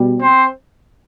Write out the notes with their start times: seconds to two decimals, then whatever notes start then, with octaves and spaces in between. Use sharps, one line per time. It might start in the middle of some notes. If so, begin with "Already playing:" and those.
Already playing: B2 G3
0.20 C4 C5